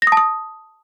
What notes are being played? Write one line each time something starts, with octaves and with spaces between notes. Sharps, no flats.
A#6
D#6
A5
D#6